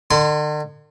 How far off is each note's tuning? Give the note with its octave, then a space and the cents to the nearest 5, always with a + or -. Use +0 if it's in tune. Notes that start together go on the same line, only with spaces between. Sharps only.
D3 +45 C6 -30